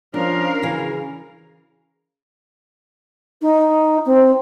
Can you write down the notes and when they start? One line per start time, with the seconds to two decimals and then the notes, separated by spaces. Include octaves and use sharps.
0.14 F3 C#4 D4 A#4 F5
0.62 C#3 E3 F#4
3.41 D#4
4.06 C4